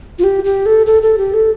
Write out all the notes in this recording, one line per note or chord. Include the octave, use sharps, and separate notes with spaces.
F4
G4
G4
A4
A4
A4
G4
A4